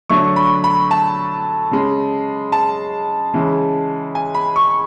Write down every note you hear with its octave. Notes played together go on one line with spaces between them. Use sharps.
D3 F#3 A3 C#6
B5
B5
A5
C#3 G#3
A5
C#3 E3 G#3
G#5
B5
C#6